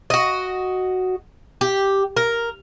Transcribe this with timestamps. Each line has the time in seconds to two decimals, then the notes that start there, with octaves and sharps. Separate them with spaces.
0.10 F#4 D#5
1.61 G4
2.17 A#4